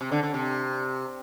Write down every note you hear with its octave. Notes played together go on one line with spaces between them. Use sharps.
C3
D3
D3
C3